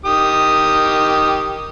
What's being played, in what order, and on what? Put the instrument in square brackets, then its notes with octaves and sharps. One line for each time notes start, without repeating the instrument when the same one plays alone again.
[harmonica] D#3 G4 D#6